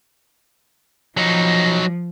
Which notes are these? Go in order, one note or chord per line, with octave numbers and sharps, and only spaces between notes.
F3 F#3 D#4